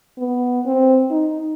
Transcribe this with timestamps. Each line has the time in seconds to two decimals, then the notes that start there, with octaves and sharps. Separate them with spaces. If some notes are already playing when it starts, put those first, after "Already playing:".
0.18 B3
0.66 C4
1.11 D#4